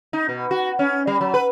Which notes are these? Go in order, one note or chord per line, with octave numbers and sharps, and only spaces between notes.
D#4
B2
F#4
C#4
G3
F#3
B4